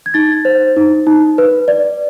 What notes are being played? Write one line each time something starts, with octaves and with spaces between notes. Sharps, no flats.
G#6
D#4 A6
C5
D#4
D#4
B4
D5